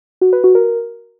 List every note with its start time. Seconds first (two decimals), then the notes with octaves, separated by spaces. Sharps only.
0.21 F#4
0.33 B4
0.44 F#4
0.55 A#4